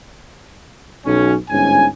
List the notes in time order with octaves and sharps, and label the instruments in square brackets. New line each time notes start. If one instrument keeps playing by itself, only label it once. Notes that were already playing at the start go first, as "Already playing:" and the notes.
[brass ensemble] B1 C#4
G1 G#2 C#4 G#5